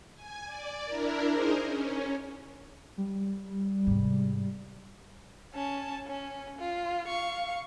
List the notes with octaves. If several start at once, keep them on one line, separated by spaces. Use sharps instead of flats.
G#5
D5
D4 E4 A#4
D#4 G#4 A#4 C5
C#4
G3
G#2 C3
C#4 A5
C#4
F4
F5 C#6